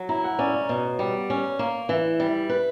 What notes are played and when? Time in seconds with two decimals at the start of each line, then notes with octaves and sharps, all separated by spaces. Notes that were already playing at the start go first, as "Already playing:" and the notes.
Already playing: F#3
0.09 E4 A#5
0.24 F#5
0.39 C#4 D5
0.48 C#5
0.54 D5
0.69 B2
0.99 G3
1.30 C#4
1.59 A#3
1.89 E3 E5
2.20 G3
2.49 B4